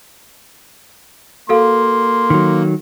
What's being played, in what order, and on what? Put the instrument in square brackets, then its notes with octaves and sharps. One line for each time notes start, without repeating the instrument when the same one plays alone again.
[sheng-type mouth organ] A#3 [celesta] F#4 A4 F5 [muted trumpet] C6
[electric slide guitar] D#3 F#3